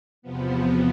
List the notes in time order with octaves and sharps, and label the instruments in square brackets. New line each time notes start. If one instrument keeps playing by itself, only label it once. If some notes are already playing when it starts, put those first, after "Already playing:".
[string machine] E2 C3 F3 B3